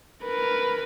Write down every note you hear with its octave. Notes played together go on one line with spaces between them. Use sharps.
A#4 B4